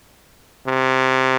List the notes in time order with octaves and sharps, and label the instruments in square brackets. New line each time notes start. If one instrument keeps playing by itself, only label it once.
[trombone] C3